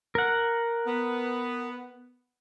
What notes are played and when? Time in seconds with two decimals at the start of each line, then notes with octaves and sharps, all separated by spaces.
0.15 A#4 F#5
0.86 B3